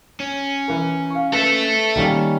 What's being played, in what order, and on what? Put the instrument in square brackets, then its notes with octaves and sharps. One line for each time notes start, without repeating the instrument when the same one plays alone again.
[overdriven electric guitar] C#4
[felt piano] E3 A#4
F5 C#6
[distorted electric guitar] A4 E5 [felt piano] B4
[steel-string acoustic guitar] D#3 G3 C#4 [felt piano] A#3